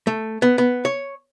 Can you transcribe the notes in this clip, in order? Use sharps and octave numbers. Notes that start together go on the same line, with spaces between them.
A3
B3
B3
C#5